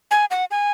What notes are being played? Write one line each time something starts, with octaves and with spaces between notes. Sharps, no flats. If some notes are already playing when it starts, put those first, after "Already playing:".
G#5
F#5
G#5